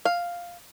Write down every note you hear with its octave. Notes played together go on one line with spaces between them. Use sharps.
F5